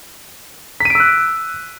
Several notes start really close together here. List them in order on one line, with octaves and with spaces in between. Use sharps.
B6 D#7 D7 E6 F#6